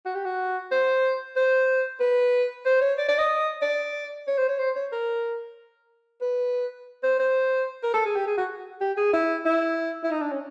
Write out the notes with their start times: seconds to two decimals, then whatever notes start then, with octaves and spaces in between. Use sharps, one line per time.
0.06 F#4
0.15 G4
0.25 F#4
0.72 C5
1.36 C5
2.00 B4
2.66 C5
2.81 C#5
2.98 D5
3.08 D5
3.19 D#5
3.62 D5
4.27 C#5
4.38 C5
4.49 C#5
4.59 C5
4.76 C#5
4.92 A#4
6.21 B4
7.03 C5
7.19 C5
7.83 A#4
7.94 A4
8.06 G#4
8.15 G4
8.27 G#4
8.38 F#4
8.81 G4
8.97 G#4
9.13 E4
9.46 E4
10.04 E4
10.11 D#4
10.21 D4
10.32 C#4